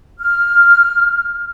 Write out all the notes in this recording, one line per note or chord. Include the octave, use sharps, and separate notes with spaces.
F6